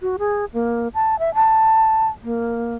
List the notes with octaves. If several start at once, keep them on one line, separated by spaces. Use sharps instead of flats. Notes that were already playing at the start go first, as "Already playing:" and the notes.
F#4
G#4
A#3
A5
E5
A5
A#3